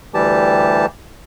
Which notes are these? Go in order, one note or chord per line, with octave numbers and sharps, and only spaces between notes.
D2 E3 G3 G4 A5